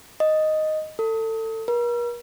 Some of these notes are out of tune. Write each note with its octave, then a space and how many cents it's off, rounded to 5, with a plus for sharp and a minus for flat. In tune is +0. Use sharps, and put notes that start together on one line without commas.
D#5 +0
A4 +25
A#4 +45